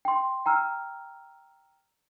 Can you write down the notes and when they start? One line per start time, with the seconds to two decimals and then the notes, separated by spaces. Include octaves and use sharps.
0.05 G5 C6
0.46 G5 A#5 E6 F6